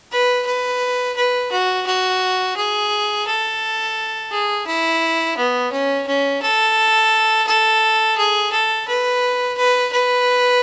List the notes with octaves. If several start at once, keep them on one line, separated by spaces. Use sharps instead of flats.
B4
B4
B4
F#4
F#4
G#4
A4
G#4
E4
B3
C#4
C#4
A4
A4
G#4
A4
B4
B4
B4